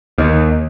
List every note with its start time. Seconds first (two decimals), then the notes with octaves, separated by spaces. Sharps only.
0.18 D#2